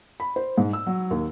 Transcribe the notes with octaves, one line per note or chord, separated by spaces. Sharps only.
B5
C5
G#2
E6
F#3
D#2